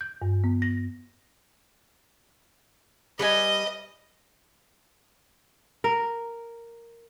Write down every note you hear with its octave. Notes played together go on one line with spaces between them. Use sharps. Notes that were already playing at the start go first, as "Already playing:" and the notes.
G6
G2
B3
A#6
G3 B4 D#5 G#5
A#4